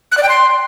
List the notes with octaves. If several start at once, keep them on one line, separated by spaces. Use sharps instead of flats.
F#6
D5
G5
C6